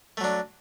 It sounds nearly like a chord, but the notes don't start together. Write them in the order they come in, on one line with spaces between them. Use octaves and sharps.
A3 F#3 D4